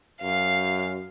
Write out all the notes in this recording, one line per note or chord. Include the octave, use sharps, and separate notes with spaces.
F#2 F5